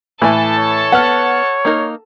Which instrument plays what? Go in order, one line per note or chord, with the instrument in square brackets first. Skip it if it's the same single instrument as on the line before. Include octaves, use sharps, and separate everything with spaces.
[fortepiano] A2 [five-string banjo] E3 G#5 [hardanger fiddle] A4 A5
[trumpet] C#5
[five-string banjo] B3 [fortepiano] F#5 F6
[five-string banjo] A#3 D#4 A#4